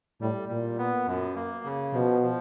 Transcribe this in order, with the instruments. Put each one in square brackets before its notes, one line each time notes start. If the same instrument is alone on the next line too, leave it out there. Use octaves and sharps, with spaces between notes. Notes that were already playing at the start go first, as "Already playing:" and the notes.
[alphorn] A2 [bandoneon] G3
[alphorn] A#2 [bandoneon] G3
[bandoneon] B3
F#2
A#3
C#3
[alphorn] B2 [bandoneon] F3
[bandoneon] F3